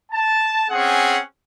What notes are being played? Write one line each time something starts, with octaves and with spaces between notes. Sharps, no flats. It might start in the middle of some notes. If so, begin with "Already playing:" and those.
A5
C4 C#4 G#4 F#5